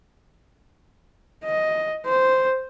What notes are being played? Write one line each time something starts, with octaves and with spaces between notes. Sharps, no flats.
D#5
C5